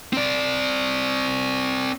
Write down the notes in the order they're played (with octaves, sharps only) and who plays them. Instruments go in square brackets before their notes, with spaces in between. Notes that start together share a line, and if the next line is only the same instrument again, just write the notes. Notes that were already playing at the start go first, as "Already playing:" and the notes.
[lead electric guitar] C4 D5